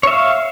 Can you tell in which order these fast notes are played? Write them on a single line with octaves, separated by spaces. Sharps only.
C#5 E5 F5